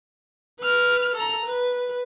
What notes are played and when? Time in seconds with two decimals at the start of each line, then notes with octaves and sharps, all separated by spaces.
0.60 B4 F6
1.16 A4 A#5
1.46 B4